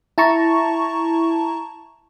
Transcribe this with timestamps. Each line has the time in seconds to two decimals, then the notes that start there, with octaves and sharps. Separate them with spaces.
0.18 E4 A5 A#5 C#6